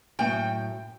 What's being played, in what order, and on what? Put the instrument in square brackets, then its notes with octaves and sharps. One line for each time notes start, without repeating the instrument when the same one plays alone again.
[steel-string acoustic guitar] F#2 A2 G5